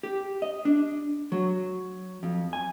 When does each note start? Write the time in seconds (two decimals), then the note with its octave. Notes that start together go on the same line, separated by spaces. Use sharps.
0.03 G4
0.42 D#5
0.65 D4
1.32 F#3
2.23 F2
2.53 G#5